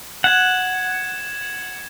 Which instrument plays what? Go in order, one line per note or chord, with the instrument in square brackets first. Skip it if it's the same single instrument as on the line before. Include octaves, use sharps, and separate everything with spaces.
[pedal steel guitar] F#5 [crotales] G#6 E7